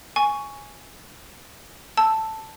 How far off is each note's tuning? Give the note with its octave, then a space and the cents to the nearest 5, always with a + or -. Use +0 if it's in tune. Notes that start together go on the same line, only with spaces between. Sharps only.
G#5 +0 C#6 +10
A5 +0 E6 +0